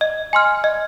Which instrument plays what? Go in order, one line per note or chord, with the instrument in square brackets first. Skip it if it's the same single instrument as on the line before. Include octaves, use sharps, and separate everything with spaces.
[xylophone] D#5
G#5 C6 F6
D#5